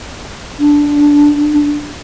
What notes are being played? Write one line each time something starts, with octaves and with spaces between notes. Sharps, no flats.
D4